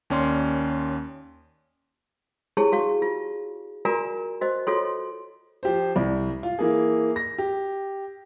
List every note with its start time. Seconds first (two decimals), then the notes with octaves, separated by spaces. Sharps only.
0.10 D#2 C#4 D5 C6
2.57 E4 G4 G#4 C#5 A5 C#6
2.72 F#4 F5 C#6
3.02 F4
3.85 F4 F#4 A#4 D5 G#5 A#5
4.41 F#4 C5 D#5
4.67 F4 F#4 A4 C#5 C6
5.63 F3 G4 C5
5.96 C2
6.43 F4
6.59 E3 A#3 G#4
7.16 A#6
7.38 G4